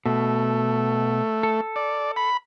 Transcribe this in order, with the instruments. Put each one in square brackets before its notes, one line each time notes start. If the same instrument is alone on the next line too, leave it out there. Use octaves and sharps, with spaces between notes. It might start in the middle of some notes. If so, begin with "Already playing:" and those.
[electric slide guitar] B2 [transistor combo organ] A3
[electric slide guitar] A4
[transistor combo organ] D5
B5